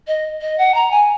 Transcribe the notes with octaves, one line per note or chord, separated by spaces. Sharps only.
D#5
D#5
F#5
A#5
G#5